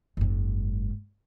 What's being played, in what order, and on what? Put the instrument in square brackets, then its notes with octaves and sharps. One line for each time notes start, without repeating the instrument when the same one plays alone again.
[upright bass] F#1 G#2